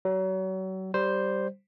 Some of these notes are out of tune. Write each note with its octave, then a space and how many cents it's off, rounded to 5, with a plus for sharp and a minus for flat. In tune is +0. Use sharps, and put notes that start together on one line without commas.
F#3 +35 C#5 +35
G3 -10 C5 +0